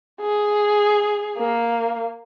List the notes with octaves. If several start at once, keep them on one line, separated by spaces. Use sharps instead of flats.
G#4
A#3